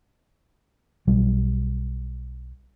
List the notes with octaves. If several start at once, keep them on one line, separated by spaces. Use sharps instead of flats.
B1 F#3 G3